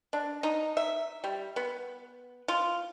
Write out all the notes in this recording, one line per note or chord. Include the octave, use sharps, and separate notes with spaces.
D4
D#4
E5
G3
B3
F4